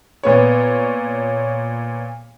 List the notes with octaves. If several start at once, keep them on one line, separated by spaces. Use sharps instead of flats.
A#2 B3 C#5